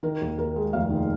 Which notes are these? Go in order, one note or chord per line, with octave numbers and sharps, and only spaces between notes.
D#3 A#4
D#2
D#2 A#4
G#3
F1 F5
D#3